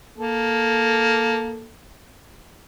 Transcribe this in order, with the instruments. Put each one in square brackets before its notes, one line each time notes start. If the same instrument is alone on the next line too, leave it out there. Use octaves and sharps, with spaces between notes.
[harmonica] A#3 A4